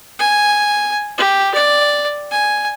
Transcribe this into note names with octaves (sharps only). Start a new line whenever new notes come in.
G#5
G4
D5
G#5